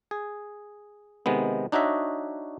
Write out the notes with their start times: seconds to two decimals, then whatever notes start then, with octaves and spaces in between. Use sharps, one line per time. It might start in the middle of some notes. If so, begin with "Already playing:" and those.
0.11 G#4
1.26 C3 D#3 G#3 B3
1.72 D4 D#4 F#4 C#5 D#5 E5